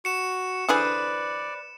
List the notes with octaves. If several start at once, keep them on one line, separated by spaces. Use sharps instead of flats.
F#4 C#7 E7
D3 E3 G#4 B4 C5 D5 D#6